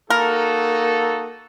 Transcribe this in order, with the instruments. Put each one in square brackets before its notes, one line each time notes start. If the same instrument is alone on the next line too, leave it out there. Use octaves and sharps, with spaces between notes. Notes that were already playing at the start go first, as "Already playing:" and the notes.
[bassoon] A#3 [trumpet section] D#4 F#4 A4 [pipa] A#4